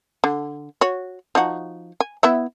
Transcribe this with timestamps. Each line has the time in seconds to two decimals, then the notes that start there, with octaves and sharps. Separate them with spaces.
0.24 D3
0.81 F#4 C#5
1.35 F3 D#4 F#4
2.00 G#5
2.23 B3 E4 E5